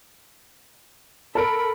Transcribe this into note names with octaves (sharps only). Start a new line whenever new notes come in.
A4 A#4 B5 D7